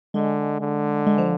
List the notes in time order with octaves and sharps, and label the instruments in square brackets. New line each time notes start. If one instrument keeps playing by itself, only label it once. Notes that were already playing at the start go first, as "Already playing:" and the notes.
[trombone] D3 [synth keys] G#3
[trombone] D3
[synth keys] G#3
F3